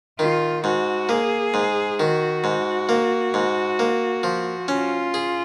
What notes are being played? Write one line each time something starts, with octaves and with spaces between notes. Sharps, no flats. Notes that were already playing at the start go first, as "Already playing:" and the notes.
D#3 F4
G#2 F#4
A#3 G#4
G#2
D#3 F#4
G#2
A#3
G#2
A#3
F3
C#4 F4
G#4